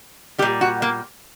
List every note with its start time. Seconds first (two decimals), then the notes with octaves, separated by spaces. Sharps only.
0.38 G3 G4
0.42 A#2
0.61 F#4
0.82 A#3